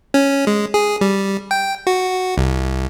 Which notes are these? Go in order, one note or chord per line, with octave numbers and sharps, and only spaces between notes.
C#4
G#3
G#4
G3
G5
F#4
C2